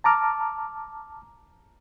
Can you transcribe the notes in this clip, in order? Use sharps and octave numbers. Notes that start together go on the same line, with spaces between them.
A5 A#5 D6 F6